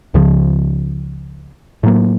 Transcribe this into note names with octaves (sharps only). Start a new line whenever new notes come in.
C#2 C#3 F3
A2 F#3 A#3